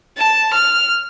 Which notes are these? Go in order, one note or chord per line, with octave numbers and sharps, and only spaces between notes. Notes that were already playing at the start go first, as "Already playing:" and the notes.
A5
F6